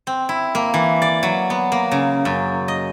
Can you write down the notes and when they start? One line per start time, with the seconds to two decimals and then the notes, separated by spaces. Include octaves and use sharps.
0.07 C4
0.29 E4
0.55 A#3
0.74 E3
1.02 D5
1.23 F#3
1.50 B3
1.72 A#3
1.91 C#3
2.25 F#2
2.68 D#5